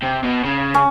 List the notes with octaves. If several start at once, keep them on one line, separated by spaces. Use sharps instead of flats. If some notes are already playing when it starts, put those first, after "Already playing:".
C3
B2
C#3
C#4